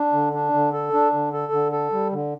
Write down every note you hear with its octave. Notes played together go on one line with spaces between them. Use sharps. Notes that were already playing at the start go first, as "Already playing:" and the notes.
Already playing: D4
D3
D4
D3
A4
D4
D3
A4
D3
A4
G3
D3